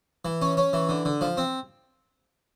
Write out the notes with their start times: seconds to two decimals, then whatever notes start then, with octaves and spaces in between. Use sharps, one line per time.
0.25 E3
0.42 C#4
0.57 C#4
0.73 E3
0.89 D3
1.05 D3
1.21 F3
1.37 C4